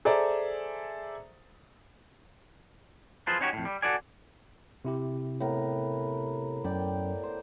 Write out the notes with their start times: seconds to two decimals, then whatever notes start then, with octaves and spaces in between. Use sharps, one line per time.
0.05 G#4 A4 C5 D5 E5 A#5
3.27 F4 G#4 B4 C5 A5
3.41 C#4 D#4 F#4 G4 C#5
3.53 F2 A2
3.65 G3
3.82 F#4 A4 D5 G#5
4.85 C3 E4 G4
5.40 A2 B3 A#4
6.64 F#2 D5 G5
7.23 C5